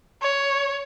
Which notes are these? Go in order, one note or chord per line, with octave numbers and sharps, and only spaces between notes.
C#5